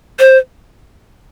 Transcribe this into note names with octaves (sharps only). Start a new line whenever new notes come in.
C5